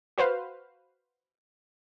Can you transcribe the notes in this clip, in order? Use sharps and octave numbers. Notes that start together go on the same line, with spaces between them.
F#4 B4 C5 F5